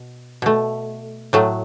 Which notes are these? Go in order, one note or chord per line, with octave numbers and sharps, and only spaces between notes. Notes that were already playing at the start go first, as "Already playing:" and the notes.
Already playing: B2
B2 A3
A2 F#3 A3